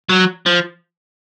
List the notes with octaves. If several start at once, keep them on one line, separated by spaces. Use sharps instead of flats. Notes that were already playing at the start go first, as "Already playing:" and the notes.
F#3
F3